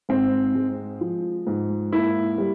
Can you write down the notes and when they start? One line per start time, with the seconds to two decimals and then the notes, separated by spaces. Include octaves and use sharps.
0.09 G#2 C4
0.55 G#3
1.01 F3
1.47 G#2
1.92 A#3 E4
2.38 G3